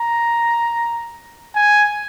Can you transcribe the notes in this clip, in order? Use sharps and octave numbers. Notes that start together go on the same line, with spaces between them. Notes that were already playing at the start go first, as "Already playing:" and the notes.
Already playing: A#5
G#5